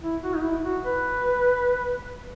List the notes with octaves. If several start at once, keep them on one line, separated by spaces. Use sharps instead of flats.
E4
F#4
D#4
E4
F#4
B4